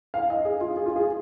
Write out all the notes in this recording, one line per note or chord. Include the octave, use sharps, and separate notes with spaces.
F5
D#5
G#4
F4
G#4
F4
G#4